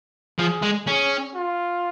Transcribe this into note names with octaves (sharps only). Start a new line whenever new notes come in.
F3 G#4
G#3
C#4 G#4
F4